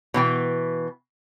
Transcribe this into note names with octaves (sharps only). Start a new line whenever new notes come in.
B2 E3 G5